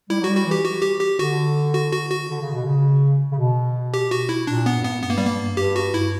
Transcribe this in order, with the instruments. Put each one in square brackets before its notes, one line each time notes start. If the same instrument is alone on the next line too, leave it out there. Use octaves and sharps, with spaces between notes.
[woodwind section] G3 [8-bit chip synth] E4
[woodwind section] F#3
[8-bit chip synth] F#4
[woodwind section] G3
[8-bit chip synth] F#4
[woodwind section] E3
[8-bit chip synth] G4
F#4
G4
G4
[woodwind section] D3 [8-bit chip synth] F#4
[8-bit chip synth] F#4
F#4
F#4
[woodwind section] D3
C#3
B2
C#3
C#3
B2
[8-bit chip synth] G4
F#4
E4
[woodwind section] A#2 [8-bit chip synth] D4
[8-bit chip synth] B3
[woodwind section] G2
[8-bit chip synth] B3
[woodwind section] G2 [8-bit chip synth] B3
[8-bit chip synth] A#3
G3
A#3
[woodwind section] G2 [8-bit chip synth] G4
[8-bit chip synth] F#4
E4